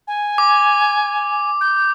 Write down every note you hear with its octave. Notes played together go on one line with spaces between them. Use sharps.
G#5
D6
G6